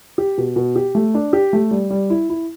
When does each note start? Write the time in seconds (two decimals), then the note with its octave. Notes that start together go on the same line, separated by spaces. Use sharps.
0.18 G4
0.38 B2
0.56 B2
0.76 G4
0.95 A3
1.14 D4
1.33 G4
1.53 A3
1.71 G3
1.90 G3
2.10 E4
2.29 E4